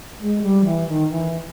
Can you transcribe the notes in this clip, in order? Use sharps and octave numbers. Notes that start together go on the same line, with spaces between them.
G#3
G3
E3
D#3
E3